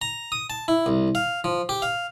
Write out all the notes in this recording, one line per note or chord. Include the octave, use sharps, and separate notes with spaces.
A#5
D#6
A5
E4
C2
F5
F3
G4
F5